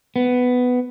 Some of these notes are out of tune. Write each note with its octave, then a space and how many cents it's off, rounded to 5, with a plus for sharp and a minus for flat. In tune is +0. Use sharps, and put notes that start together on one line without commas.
B3 +10